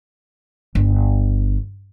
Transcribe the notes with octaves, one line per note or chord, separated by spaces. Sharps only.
G1